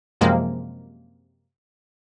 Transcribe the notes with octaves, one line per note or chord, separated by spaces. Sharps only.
F#2 C3 F3 G#3 A#3